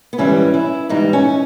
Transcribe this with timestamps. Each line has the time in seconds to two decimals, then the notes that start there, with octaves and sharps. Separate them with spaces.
0.13 B3
0.18 G#2 E3 G3 C#4
0.54 E4
0.89 G#2 E3 G3 D#4
1.13 C#4